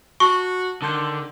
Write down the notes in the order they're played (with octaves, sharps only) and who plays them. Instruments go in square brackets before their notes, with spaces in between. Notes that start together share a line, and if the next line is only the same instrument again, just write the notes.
[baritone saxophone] F#4 [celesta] A5 [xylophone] C#6
[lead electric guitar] D3 [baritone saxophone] D#3 [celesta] A5 C6 G6